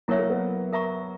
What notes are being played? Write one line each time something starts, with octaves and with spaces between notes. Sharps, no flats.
F#3 E4 A#4 C#5 E5
A#3
B3
A#4 E5 A#5 C#6